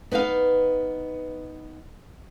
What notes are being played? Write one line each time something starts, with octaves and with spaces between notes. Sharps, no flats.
B3 D#4 B4 F5